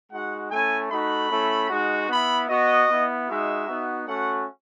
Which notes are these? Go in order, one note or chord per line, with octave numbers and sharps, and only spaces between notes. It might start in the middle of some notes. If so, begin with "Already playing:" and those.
G#3 D#4 F#4 F#5
A3 C#4 E4 G#5
A3 D#4 F#4 B5
A3 C#4 E4
G#3 D#4 F#4
B3 E4 B5
B3 F#4 D#5
B3 E4
G#3 D#4 F#4 E5
B3 D#4 F#4
A3 C#4 F#4 F#5